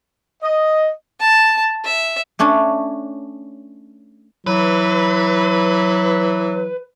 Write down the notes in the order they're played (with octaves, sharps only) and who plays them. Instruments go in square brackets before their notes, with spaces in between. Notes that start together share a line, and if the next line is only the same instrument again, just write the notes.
[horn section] D#5
[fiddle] A5
E5
[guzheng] A3 C#4 D4 C#5
[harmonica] E3 [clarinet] F#3 [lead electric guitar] B4